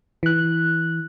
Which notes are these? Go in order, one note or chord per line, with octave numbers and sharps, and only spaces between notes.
E3 F#6